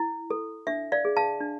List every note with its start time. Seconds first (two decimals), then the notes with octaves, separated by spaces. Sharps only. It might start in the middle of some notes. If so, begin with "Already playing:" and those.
Already playing: E4
0.30 A4
0.67 D4 E5
0.92 D5 F5
1.05 G#4
1.17 F5 A5
1.41 D4